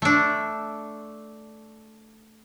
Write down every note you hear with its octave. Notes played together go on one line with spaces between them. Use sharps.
A3 D4